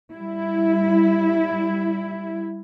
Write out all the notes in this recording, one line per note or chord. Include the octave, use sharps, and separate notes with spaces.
G3 E4